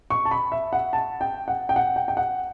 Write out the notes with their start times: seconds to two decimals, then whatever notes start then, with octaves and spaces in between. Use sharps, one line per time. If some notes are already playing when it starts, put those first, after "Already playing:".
0.10 C#6
0.25 A5
0.31 B5
0.52 E5
0.73 F#5
0.93 A5
1.21 G5
1.48 F#5
1.69 G5
1.76 F#5
1.96 G5
2.08 G5
2.17 F#5